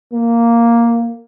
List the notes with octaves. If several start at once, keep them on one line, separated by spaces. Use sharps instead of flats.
A#3